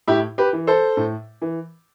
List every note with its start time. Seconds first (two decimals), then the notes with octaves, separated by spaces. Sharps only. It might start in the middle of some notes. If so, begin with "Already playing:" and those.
0.08 A2 E4 G4
0.38 G4 B4
0.53 E3
0.67 A4 C5
0.97 A2
1.42 E3